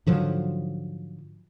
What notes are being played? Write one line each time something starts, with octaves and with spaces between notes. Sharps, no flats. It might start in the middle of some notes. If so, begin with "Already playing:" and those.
G#2 D3 F3 F#3